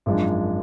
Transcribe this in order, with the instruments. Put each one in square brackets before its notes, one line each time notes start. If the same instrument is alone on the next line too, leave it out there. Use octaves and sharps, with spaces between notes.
[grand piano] G#1 F#2 F3 G#3 D4